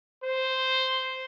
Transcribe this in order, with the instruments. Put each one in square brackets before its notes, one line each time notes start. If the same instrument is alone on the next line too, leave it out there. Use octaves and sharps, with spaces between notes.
[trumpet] C5